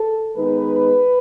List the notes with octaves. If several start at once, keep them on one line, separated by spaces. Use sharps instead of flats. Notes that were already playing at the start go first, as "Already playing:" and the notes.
Already playing: A4
D#3 G#3 B3 D#4 B4